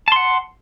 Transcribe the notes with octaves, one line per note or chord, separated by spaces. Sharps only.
F#5 A5 C6